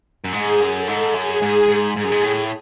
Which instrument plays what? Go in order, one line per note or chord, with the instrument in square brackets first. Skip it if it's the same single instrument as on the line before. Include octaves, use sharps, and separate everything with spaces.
[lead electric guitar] F#2
[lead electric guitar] G#2 [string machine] G#4
[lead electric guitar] F#2
[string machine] A4
[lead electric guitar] G#2
[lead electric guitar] F#2 [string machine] G#4
[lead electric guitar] G#2
G#2
[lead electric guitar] G#2 [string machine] G#4
[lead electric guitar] F#2
G#2
A2